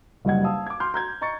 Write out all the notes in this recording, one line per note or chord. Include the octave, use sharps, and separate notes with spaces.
F#1 G2 G3 D#5 F#5 G#6
F5 A5 D#6 E6
D6 G#6
C6 D6 F6 G6
A#5 G6 G#6
D#5 A#5 C#6 A6 C#7